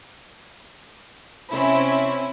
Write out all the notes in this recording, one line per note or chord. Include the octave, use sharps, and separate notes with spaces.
C3 C4 C#4 E4